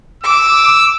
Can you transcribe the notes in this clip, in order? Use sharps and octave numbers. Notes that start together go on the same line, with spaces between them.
D6 E6